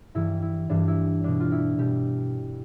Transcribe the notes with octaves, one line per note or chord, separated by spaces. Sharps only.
G2 E3 G3 E4
E4
G2 E3 G3 D4
E4
B2 G3 D4
F4
E4
B2 G3 G4